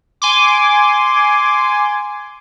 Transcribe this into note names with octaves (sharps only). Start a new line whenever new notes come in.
G#5 C6 D6